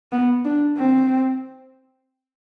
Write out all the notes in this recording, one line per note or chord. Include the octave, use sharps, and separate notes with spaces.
B3
D4
C4